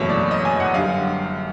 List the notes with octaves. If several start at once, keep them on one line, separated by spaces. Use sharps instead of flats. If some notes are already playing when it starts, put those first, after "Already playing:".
Already playing: F#1 E2 B2 F#3 A3 C#5
D5
D#5
G#5
F#5
F#2 D3 G3 F5